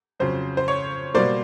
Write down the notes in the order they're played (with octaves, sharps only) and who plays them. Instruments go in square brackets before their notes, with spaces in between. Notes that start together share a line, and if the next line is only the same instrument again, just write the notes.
[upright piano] F2 C#3 F#3 C5
C5
C#5
B2 G3 A#3 C5 D5